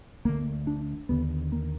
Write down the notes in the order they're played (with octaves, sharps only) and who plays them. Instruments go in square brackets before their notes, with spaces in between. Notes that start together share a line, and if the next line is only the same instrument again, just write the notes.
[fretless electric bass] D2 D3 A#3
D4
D#2 D3 B3
A#3